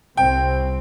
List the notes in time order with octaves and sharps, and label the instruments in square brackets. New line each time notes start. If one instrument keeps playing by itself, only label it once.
[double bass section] C2 C4 [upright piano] G5